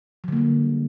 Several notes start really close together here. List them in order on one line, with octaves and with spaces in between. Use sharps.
F#3 D3 A#3 G3